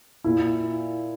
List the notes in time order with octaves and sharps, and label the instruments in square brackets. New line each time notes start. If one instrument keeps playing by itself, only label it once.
[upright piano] A#2 E4